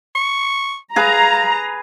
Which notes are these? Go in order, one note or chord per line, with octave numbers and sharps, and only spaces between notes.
C#6
G#4 B4 F5 A#5